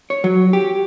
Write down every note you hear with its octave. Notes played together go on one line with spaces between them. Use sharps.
C#5
F#3
G4